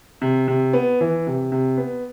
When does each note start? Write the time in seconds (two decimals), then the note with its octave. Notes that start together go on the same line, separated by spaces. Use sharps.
0.22 C3
0.48 C3
0.73 B3
1.01 E3
1.27 C3
1.52 C3
1.78 B3